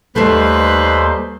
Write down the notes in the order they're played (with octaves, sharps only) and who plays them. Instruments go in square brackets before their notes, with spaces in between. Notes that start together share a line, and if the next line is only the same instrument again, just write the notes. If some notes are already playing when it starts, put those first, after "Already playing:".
[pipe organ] D#2 C5 C6 [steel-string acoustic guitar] G3 A3 [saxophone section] D#4 B4